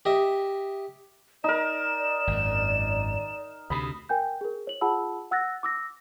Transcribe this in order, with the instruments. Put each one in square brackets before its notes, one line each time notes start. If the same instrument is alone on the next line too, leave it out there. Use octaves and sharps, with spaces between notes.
[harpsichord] G4 D#5 E5
[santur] D#4 A#4 [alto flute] D5 [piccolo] E7
[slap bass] G#1 F#2
[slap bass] D2 C3 [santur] B5 [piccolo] D#6
[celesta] A#4 G5 G#5 G6
G#4 A#4
C#5 F#7
F4 G#4 F#5 A5 B5 E6
F#5 E6 F#6 A6 A#6
D6 E6 A#6